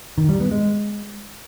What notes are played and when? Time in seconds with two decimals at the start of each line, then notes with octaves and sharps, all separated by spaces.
0.18 D#3
0.29 G3
0.40 B3
0.51 G#3